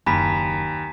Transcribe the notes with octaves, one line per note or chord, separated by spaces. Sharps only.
F#1 D#2 G#5 A#5 B5 B6